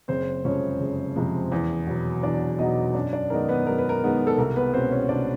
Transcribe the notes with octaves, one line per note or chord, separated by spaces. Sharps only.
F#1 C4 C5
F2 C3 F3 G#3 C#4 C#5
F#1
F2 C3 F3 G#3
E2
B2 F#3
E2 D4 D5
B2 F#3 D#4 D#5
F#2 D4 D5
D4 D5
D#3 G#3 B3 D#4 A#4
B3 B4
F#2 A#4
B4
A#4
D#3 G#3 B3 D#4
A4
C2 A#4
B3 B4
B2 G#3 C4 C#4 C5
C#4 C#5
C2 D4 D5